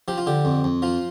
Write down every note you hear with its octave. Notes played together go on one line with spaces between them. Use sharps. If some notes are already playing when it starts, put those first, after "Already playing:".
F3 G4
F4
D3 G4
F2
F2
F3 F4